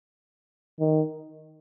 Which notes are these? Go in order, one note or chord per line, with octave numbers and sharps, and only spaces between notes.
D#3